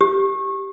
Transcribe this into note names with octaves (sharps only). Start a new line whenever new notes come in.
G4